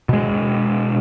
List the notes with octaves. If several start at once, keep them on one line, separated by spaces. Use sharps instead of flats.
B2 G#3